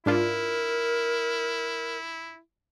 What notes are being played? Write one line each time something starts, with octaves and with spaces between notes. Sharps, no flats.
G#2 D4 E4 F4 A#4